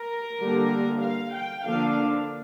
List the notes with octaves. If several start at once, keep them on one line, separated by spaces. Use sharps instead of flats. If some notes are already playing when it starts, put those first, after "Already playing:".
Already playing: A#4
D3 G3 A#3
F5
G5
D3 F3 A#3 D4 F5